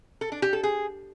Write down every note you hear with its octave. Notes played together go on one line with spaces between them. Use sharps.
A4
D4
G4
A4
G#4